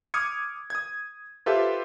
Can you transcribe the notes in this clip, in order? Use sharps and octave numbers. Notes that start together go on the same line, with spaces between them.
D6 D#6 F6 G#6 C#7
D#6 G#6
F4 G4 A4 B4 C5 E5